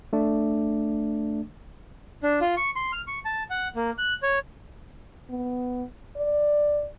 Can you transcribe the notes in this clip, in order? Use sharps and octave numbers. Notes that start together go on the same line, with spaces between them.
A3 D4
D4
F4
C#6
C6
F6
C#6
A5
F#5
A#3
F#6
C#5
B3
D5